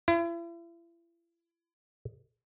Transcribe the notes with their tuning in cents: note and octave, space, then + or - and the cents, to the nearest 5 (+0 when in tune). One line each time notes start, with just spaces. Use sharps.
E4 +40